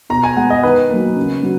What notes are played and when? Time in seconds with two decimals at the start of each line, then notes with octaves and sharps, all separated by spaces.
0.10 B2 A#5
0.23 G#5
0.36 G#3 B3 F#5
0.50 D#5
0.63 D#3 B4
0.90 F#3 A#3
1.16 C#3
1.43 F#3